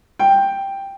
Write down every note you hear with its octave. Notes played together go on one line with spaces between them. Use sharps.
G5